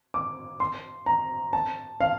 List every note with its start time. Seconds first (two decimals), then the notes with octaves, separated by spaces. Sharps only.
0.14 D6
0.60 C6
1.06 A#5
1.53 A5
2.01 F5